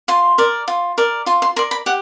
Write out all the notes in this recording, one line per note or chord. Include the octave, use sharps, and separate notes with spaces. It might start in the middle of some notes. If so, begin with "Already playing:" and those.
F4 C6
A#4 D5
F4
A#4 D5
F4 C6
C6
A#4 D5 C6
B5
G4 F#5